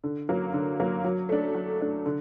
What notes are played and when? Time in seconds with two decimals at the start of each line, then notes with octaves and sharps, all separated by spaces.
0.04 D3
0.29 F#3 A#3
0.54 D3
0.80 F#3 A#3
1.04 F#3
1.29 A3 D4
1.54 F#3
1.80 A3 D4
2.06 D3